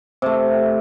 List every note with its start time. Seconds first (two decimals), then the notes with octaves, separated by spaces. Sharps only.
0.22 C3 A3